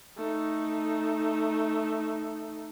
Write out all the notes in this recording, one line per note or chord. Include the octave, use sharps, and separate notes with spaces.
A3 D#4